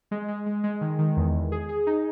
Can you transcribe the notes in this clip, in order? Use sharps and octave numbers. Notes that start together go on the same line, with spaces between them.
G#3
G#3
G#3
G#3
D#3
D#3
E2
E2
G#4
G#4
D#4